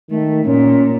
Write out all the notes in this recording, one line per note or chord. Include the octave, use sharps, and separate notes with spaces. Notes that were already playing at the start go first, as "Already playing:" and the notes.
D#3 A3
A#2 C#4